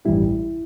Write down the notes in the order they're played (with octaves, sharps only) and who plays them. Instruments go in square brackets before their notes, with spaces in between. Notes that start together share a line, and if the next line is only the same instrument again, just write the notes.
[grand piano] A1 G2 G3 [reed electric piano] E4